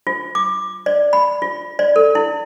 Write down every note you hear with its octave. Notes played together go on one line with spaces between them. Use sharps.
F4
D6
D5
B5
F4
D5
A4
E4